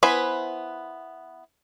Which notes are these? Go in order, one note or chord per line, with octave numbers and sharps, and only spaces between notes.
B3 E4 B4 C5 G#5